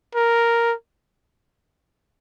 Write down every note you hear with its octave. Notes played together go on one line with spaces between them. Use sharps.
A#4